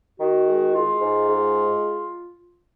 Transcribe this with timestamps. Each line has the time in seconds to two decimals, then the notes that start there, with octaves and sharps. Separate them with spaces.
0.19 D#3 F#4
0.47 G#3
0.74 G#3 F4
1.01 G#2
1.28 G#3